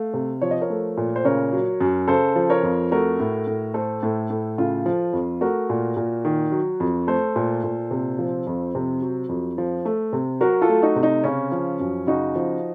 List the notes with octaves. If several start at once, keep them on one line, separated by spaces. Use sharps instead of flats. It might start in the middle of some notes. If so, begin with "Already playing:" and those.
Already playing: A3 F5
C3
F3 C#5
D#5
A#4 C#5
A3
A#2
C5
C#3 A#4 C#5
F#3
F#2
C#3 A4 C5
F3
A#4 C#5
F2
A3 F#4 A#4
A2
A2
A3 A4 C5
A2
A2
C#3 F4 A4
F3
F2
A3 F#4 A#4
A#2
A#2
D#3
F#3
F2
A3 A4 C5
A#2
A#2
C3
F3
F2
C3
F#3
F2
F3
A3
C3
F#3 F#4 A#4
F4 A4
A3
D#4 F#4
C3
D#4
C#3 C#4
F3
F#2
C#3 D#4 F#4
F3